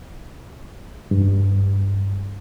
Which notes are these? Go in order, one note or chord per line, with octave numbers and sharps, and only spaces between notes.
G2